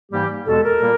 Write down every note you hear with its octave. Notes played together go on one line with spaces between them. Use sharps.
G#2 E3 G3 A#3 G4
E2 B2 G#3 A4
A#4
A#2 G3 A#3